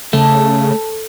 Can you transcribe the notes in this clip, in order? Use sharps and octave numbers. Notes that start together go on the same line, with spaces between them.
C#3 A3 A4